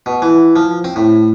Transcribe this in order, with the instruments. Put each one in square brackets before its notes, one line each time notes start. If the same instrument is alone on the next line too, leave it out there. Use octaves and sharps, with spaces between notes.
[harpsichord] B2
E3
F3
C4
A2